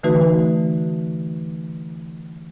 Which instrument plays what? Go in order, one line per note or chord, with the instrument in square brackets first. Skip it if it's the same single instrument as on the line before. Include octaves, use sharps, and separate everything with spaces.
[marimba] D3 E3 A3 D#4 F#4 B4